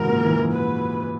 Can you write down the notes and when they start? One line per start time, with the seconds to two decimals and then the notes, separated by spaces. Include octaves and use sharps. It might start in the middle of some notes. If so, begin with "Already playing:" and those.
Already playing: G#2 C#3 E3 F#3 A#4
0.09 A#2
0.23 E3
0.37 E3
0.51 B4